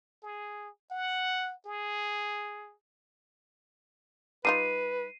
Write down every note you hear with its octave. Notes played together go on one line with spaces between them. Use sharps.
G#4
F#5
G#4
G3 D#4 F4 B4 C7 D#7